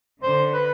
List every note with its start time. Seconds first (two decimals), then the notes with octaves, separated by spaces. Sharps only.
0.23 D3 C5
0.54 B4